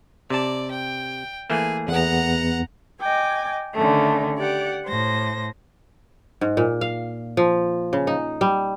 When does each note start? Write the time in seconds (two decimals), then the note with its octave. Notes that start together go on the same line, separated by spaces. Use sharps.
0.30 C3 D5 A5
0.71 G5
1.50 E3 A3 A#3 G#4
1.88 E2 B3 F#5 A#5
3.02 D#5 G5 G#5 D6
3.74 D3 D#3 A3 C#4
4.38 G4 D5 F#5
4.86 A2 C5 A#6
6.41 G#2
6.57 A#2
6.81 F5
7.37 F3
7.93 C#3
8.07 D#4
8.41 G3